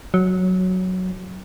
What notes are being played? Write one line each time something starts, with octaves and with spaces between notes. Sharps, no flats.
F#3